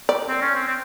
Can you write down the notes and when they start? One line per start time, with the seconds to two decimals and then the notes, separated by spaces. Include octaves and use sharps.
0.09 D5
0.28 C4
0.42 C#4
0.55 C4
0.67 C4